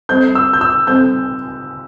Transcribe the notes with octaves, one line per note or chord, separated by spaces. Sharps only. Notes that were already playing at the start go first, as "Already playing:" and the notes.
G3 C4 A4 C5 G6
E6
G6
E6
G3 C4 A4 C5 G6